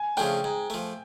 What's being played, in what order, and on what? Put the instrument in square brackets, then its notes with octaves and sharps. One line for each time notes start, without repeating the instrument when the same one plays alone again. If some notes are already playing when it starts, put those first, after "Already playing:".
Already playing: [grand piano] G#5
[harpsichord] C#3 F3 A3 D4 [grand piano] G5
[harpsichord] G#2
F3 A3